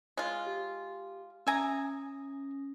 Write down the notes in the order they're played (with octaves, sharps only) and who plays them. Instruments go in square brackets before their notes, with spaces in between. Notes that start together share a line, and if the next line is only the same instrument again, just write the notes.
[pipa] G#3 F4 [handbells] C#5
[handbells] G4
[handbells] C#4 D#6 A#6 [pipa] E5 G#5 A#5